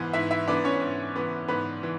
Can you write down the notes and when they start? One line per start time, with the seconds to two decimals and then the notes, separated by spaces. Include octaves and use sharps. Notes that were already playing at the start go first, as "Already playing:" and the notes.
Already playing: G#2 E3 B3
0.13 G#2 E4 E5
0.31 E4 E5
0.47 E3 B3 D4 D5
0.64 C#4 C#5
0.81 G#2
1.16 E3 B3
1.48 G#2 B3 B4
1.83 E3